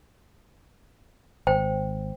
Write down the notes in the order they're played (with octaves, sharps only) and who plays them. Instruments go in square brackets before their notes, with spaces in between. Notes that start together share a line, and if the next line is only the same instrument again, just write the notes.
[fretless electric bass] G#1 [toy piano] C5 G5